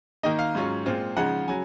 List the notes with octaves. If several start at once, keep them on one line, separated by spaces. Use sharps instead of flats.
D#3 A#3 D#4 D#5
F5
G#2 F#3 C#4 F4
A#2 G#3 C4 F4
C#3 F3 G#3 D#4 F#5
C#3 F#3 G#5